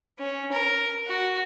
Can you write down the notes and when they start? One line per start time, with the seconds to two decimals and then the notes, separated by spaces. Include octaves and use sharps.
0.19 C#4
0.52 A#4
1.07 F#4